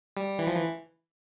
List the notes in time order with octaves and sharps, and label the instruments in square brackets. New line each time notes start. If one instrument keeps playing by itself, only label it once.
[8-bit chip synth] G3
E3
F3
E3